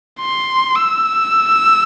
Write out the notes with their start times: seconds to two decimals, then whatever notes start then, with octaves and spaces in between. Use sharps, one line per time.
0.21 C6
0.76 E6